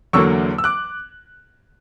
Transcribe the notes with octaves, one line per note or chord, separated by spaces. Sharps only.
E2 D3 F#3 A#3 C#6 E6
E6
D6 F#6